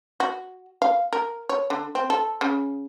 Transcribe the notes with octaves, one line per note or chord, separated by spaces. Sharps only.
F#4
F5
A#4
C#5
D3
C4
A4
C#3